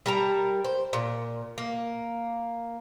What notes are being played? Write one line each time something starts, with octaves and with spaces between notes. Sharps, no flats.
G3 A#4 A5 A#5
C5
A#2
A#3